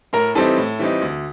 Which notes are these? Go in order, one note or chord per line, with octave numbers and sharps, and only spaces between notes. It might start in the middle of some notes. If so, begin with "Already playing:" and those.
A2 A#4 A#5
E3 G3 C4 D#4 A4 A5
A2
E3 G3 C4 D#4
D2